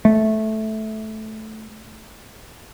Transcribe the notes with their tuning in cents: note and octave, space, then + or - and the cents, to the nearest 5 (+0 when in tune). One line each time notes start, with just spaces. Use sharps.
A3 -10